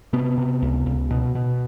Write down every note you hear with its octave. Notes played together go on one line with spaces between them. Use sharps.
C3 B3
C3
C#2
C#2
B2
B2